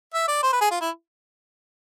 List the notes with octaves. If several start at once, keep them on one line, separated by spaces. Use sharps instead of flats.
E5
D5
C5
B4
G#4
F4
E4